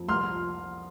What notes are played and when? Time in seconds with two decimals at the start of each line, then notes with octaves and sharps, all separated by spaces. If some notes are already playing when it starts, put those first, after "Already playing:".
Already playing: F2
0.08 C2 C6 F6
0.31 F3